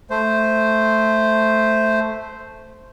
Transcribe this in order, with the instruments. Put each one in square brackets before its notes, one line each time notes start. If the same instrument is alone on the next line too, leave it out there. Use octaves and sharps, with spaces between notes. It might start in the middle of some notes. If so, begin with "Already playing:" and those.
[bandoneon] A3 C5